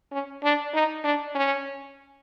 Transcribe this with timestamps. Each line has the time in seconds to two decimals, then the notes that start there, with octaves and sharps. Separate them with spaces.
0.12 C#4
0.43 D4
0.74 D#4
1.04 D4
1.35 C#4